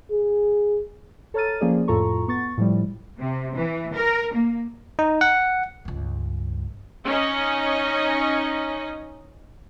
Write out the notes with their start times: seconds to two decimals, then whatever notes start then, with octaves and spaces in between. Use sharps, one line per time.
0.11 G#4
1.34 A4 C#5 A#5 F6 A6 D#7
1.61 F3 A#3 C#4 G#4 D5
1.88 F2 A2 F4 A4 A#5 C#6
2.28 B3 C#6 A6
2.57 A2 F3 G3
3.18 C3
3.56 E3
3.94 A#4
4.34 A#3
4.99 D#4
5.21 F#5
5.85 C#2 G2
7.06 C#4 D#4 D#5